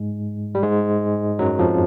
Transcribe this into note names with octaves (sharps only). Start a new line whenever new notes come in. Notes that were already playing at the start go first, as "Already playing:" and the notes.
Already playing: G#2 G#3
G3
G#2 G#3
F#2 F#3
F2 F3